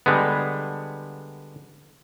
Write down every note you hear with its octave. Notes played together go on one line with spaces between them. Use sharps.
D3 G3 G#3 B3